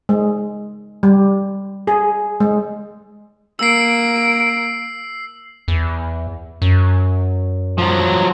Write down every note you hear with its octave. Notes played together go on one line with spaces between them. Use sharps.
G#3
G3
G#4
G#3
A#3 E6 C7 D7
E2
F#2
F3 F#3